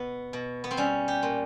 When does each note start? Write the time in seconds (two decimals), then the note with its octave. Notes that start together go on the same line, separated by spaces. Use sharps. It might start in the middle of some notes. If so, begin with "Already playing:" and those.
Already playing: B2 B3
0.33 B2
0.64 B3
0.71 C4
0.77 G3 C#4
1.08 G4
1.23 A#2